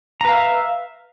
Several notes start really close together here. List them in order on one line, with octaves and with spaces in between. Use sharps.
A#5 B4 F5 E5